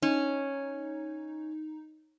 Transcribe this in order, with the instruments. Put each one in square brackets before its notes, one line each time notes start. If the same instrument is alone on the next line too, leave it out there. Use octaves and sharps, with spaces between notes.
[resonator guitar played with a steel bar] C#4 [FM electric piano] D#4